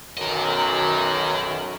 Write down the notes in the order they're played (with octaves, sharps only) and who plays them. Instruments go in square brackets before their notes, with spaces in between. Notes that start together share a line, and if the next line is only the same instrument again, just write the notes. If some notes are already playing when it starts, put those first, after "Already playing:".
[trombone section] B1 F#2 [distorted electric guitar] A#4 D#5